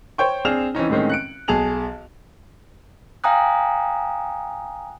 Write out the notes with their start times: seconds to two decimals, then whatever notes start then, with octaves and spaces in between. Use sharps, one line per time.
0.18 C5 C#5 G5 C#6
0.45 C4 D4 G#4 F6 E7 F7
0.75 E3 C4 C#4 D#4
0.90 A2 D#3 G#3 C4 C#4
1.09 F#6 C#7 D7
1.48 B1 G#4 A5 F7 F#7
3.24 F5 G5 G#5 A#5 D#6 F#6